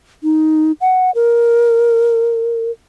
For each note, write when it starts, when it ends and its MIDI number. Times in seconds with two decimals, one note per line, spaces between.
0.23 0.72 63
0.81 1.11 78
1.15 2.71 70